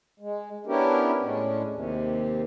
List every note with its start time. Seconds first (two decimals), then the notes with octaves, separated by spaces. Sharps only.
0.20 G#3
0.67 B3 C#4 D4 E4 G4 A#4
1.21 A2 G#3 C#4 D4
1.70 D#2 C3